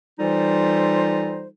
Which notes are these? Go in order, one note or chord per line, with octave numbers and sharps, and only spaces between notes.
E3 G3 D#4 F4 A4 C5